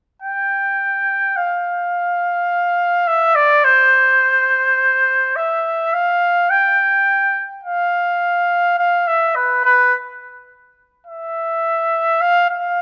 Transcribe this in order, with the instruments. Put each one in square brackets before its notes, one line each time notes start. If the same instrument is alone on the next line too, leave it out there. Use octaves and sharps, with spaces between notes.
[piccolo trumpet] G5
F5
E5
D5
C5
E5
F5
G5
F5
F5
E5
B4
B4
E5
F5
F5